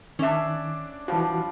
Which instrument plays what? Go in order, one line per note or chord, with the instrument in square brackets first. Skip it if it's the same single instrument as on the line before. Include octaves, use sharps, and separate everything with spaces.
[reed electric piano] D#3 [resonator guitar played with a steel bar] C#4 E5 [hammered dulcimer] D4 D5
[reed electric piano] E3 F#4 [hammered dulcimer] F3 G3